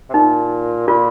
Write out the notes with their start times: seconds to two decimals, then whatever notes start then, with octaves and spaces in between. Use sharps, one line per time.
0.10 C3
0.14 A#2 D#4
0.87 A#2 F4